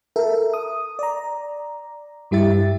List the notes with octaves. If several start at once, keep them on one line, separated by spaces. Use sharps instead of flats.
A4 A#4 E5
D#6
D5 A#5
G2 G3 E4 G4 E5 A6